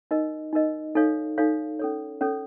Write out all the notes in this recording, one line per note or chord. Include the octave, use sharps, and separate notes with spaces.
D#4 A#4 D#5
D#4 A#4 D#5
D#4 A4 C#5 F5
D#4 A4 C#5 F5
C#4 A4 C#5
C#4 A4 C#5